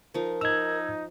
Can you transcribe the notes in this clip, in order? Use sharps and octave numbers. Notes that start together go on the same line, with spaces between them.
F3 D#4 A#4
D#4 A#5 E6 G#6